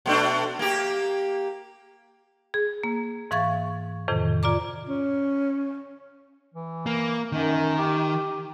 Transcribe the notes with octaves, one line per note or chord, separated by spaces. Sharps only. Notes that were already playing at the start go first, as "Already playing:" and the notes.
B2 A3 D4
A#3 G4
G#4
A#3
G#2 E3 F5 C#6 G#6 A6
F2 A2 C3 D#3
F4 D5 A#5 D6
C#4
E3
A#3
F#2 D#3
G4